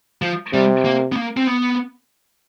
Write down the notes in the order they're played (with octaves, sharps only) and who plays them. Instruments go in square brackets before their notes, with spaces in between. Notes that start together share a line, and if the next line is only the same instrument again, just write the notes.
[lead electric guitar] F3
[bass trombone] C3 [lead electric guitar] G3
[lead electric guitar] A#3
B3
A#3
C4
B3